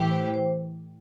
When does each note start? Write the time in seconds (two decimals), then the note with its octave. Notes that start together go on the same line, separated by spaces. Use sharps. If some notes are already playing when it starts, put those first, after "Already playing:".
Already playing: A2 E3 G4
0.11 C5
0.34 C5